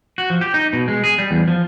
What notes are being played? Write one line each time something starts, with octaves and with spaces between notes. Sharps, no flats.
F#4
F3
G4
D#4
B2
G#3
G#4
G3
E2
F3